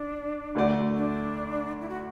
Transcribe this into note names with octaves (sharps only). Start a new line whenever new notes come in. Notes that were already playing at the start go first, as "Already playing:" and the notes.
Already playing: D4
D2 D3 A3 F#4 D5
D4
E4
F#4